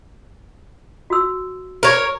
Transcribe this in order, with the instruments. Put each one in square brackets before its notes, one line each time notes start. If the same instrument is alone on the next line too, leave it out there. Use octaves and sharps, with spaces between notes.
[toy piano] F#4 E6
[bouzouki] A#4 C#5